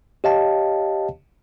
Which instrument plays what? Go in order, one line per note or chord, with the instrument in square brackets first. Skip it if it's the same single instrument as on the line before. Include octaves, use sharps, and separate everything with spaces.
[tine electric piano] G4 C#5 D#5 F5 G5 A5